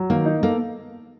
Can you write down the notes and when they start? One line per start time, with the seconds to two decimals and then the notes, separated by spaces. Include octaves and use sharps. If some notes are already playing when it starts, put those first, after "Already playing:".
Already playing: F#3
0.10 D#3 A#3
0.26 D#4
0.43 A#3 A4